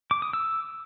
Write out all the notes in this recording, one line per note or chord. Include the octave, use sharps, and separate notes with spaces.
D6
D#6
E6